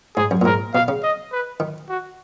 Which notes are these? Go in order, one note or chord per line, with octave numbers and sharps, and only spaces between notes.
G#2 G#4
F#2
A#2
G#2 A#4
B2 F5
C#3
D#5
B4
D#3
F#4